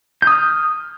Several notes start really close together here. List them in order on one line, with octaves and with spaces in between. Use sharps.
G6 D#6 F6